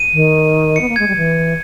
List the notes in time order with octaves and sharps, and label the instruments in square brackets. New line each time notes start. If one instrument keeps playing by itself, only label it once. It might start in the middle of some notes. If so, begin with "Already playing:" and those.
Already playing: [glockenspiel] D#7
[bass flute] D#3
[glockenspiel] C#7
[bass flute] B3
A#3
[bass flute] G#3 [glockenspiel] G#6
[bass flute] G3
E3